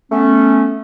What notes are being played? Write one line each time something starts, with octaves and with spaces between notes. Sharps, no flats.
A3 B3 C#4